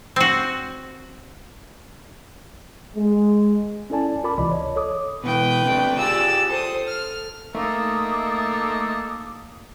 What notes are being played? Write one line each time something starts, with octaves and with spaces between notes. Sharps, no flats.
C4 F#4
G#3
C#4 E4 A4 D5 G#5 A5
F4 A#4 A5 B5 D6
C#2 C3 E3 D5 D#5 B5
C#5 D#5
A4 C#5 D6 D#6
B2 E3 B4 G5
C3 A3 D4
F4 G4 G#4 D5 E6
A4 C5 D#6
F6
A3 A#3 D#4 A4 D6 D#6